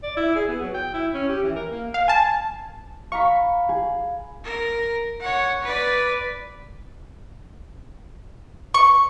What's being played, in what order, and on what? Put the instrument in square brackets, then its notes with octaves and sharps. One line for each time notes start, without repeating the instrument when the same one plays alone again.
[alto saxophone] D5
E4
G#4
B3
F#3
G5
E4
C#4
G4
E3
A#4
A#3
[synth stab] F5
G#5 A5
[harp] F5 A#5 B5 [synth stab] C#6
[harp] G#4
[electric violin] A#4
C#5 F#5
B4 D5
[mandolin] C#6